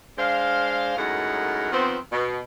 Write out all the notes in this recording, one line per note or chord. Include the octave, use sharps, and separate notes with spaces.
G#3 D4 C5 F5
F#2 A2 G#3 D#4 A#4 F#5
D#3 F3 B3 C4
B2